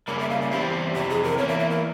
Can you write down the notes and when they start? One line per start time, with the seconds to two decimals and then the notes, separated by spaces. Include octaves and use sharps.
0.07 C#3 G3 A#3 A#4
0.19 E5
0.30 F5
0.41 E5
0.51 E2 E3 G3 C4 E4 G4
0.94 F2 C3 E3 G4
1.10 G#4
1.23 A#4
1.38 E2 E3 A#3 C#5
1.48 E5
1.59 E5
1.70 A#4